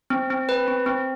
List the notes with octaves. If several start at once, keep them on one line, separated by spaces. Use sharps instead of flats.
C4
C4
B4
C4
C4